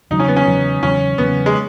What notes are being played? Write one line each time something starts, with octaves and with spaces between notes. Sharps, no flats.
E2 C#3 F#3 D#4
C#4
B3
C#4
E2 C#3 F#3
E2 C#3 F#3 C#4
E2 C#3 F#3 B3
G#3